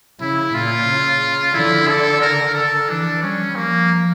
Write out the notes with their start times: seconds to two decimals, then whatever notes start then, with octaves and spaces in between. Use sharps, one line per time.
0.20 C#3 E4
0.54 A#2 F4
0.87 C#3
1.54 D3 E4
1.88 A4
2.21 A#4
2.55 A4
2.89 E3 D4
3.23 G3 C#4
3.56 F3 A#3